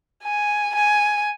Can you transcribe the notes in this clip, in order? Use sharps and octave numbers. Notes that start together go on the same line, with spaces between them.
G#5
G#5